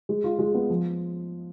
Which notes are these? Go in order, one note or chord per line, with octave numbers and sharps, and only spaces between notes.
G#3
F4
G#3
B3
F3